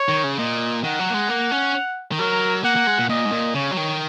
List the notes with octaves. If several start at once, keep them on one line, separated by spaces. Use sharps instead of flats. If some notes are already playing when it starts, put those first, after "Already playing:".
Already playing: C#5
D#3
C#3
A#2 D#5
D#3 F#5
F#3
A#3
G#3
A#3
C#4
D#3
F#3 A#4
A#3 F#5
A#3
G#3
A#2
A#2 D#5
G#2
A#2
C#3 C#5
F#3
D#3